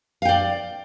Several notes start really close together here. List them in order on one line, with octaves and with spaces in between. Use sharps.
F5 G5 D5